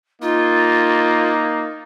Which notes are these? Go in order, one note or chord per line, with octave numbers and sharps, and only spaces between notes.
A#3 D#4 F4